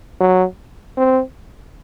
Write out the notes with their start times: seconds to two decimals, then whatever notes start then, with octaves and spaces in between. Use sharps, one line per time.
0.21 F#3
0.98 C4